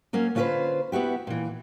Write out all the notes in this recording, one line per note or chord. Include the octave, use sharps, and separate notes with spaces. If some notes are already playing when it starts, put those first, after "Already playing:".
F#3 A#3 C#4
D3 C#4 F4 G#4 B4 C5
B3 E4 F#4 G4
A#2 E3